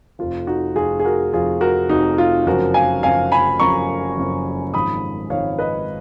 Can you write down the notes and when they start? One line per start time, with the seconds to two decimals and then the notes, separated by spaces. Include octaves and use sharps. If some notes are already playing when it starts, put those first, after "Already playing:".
0.19 F1 F2 F3 F4
0.47 D#4 F#4
0.75 F1 F2 F3 F4 G#4
1.00 G#4
1.05 F#4 A#4
1.33 F1 F2 F3 F4 G#4
1.61 F#4 A#4
1.89 F1 F2 F3 D#4 F#4
2.18 F4
2.46 F#1 F#2 F3 F#4 A#4
2.74 F5 G#5
3.03 F#1 F#2 F3 F5 G#5
3.32 G#5 B5
3.60 F#1 F#2 F3 A#5 C#6
4.17 F#1 F#2 F3
4.74 G#1 G#2 F3 B5 D#6
5.30 G#1 G#2 F3 C#5 F5
5.59 B4 D#5